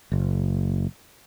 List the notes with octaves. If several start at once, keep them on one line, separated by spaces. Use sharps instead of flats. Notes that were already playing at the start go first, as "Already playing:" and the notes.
F#1